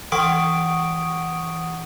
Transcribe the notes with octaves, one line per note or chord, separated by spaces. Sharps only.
E3 F#5 C#6 D#6 D7